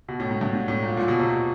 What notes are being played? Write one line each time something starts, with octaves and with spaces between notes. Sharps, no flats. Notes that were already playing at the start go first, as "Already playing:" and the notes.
B2
A2
G#2
G2
G#2
A2
A#2
A#2
B2
C3
B2